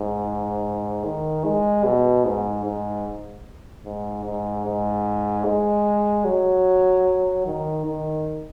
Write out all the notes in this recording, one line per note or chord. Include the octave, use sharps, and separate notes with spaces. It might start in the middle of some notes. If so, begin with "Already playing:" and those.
Already playing: G#2
D#3
G#3
B2
G#2
G#2
G#2
G#2
G#2
G#3
F#3
D#3
D#3